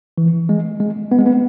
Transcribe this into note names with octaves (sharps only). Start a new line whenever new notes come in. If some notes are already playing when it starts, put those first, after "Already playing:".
E3
G#3
G#3
B3
G#3
B3